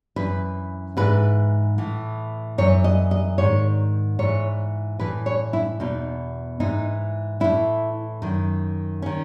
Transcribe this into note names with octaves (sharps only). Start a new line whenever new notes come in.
F#2 E3 B4
G#2 E3 B4
A2 E3
F#2 E3 C#5
D#5
D#5
G#2 D#3 C#5
G#2 E3 C#5
A2 E3 B4
C#5
E4
E2 B2 D#4
G#2 E3 D#4
A2 E3 E4
F#2 D#3
D#3 C#4